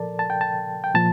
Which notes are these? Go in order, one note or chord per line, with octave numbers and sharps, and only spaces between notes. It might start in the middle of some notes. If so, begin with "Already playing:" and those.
Already playing: A#2 F3 A4 A#4 D5 A5
A5
G5
A5
G5
A#2 F3 A5